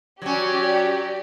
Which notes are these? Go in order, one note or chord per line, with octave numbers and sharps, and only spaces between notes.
F#3 C#4 G4 D5